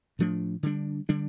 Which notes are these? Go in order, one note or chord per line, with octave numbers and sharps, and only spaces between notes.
A2 F3 A3 D4
D3 G3 D4
D3 G3 D4